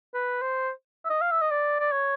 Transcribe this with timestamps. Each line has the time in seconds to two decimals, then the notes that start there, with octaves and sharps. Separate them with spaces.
0.14 B4
0.42 C5
1.05 E5
1.10 D#5
1.22 F5
1.31 E5
1.41 D#5
1.51 D5
1.80 D5
1.92 C#5